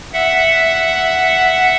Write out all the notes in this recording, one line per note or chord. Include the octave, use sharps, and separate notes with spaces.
E5 F#5